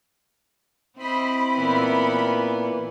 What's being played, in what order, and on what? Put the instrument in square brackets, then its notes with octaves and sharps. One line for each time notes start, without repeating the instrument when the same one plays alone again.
[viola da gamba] C4 E4 [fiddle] C5 D#5 [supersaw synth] B5
[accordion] A#2 E3 [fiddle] B3